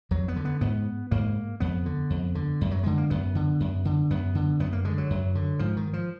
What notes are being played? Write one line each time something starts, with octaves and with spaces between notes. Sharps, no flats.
F2 F#3
B3
D3
B3
G#2 B3
G#2 A#3
F2 B3
D3
F2
D3
F#2
F#3
D3 G#3
A#3
F#2 B3
D3
F#2
D3
F#2 B3
D3
F#2 B3
A#3
D3 G#3
F#3
F#2
D3
G#2 F3
D#3
F3